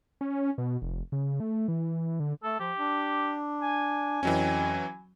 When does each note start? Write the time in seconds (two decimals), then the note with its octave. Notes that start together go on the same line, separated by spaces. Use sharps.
0.21 C#4
0.58 B2
0.82 F1
1.12 C#3
1.40 A3
1.68 E3
2.20 D3
2.43 A3 A4
2.59 F3 G4
2.78 D4
3.62 G#5
4.23 F2 E3 F#3 C#4